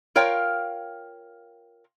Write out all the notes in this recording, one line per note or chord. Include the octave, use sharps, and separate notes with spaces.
F4 A#4 C#5 F5 G5